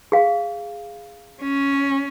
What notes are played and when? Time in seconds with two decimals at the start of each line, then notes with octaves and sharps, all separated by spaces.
0.12 G#4 F5
1.42 C#4